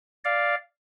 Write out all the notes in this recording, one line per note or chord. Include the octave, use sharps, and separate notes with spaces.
D5 F5